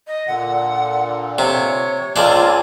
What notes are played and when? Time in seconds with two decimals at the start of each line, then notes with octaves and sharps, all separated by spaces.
0.07 D#5
0.27 A#2 D3 F#5
1.38 C3 C#5
2.16 C#2 A#3 C4 D4 F4 G#5